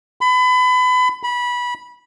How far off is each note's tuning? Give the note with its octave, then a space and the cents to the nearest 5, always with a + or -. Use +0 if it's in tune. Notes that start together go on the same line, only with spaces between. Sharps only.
B5 +30
B5 -20